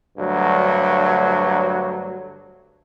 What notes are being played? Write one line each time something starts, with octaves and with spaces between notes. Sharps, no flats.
D2 G2 F#3